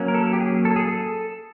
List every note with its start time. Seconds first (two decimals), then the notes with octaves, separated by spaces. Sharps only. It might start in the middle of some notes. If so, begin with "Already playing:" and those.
Already playing: F#3 A#3 C#4
0.08 A#4
0.14 A4
0.33 G4
0.40 G#4
0.65 A4
0.76 G#4
0.86 A4